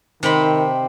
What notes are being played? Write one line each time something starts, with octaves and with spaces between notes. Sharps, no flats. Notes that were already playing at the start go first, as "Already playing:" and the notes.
C3 D#3 C4 B5